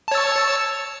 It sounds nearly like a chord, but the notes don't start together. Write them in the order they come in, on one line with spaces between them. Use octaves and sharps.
A5 C#5 E6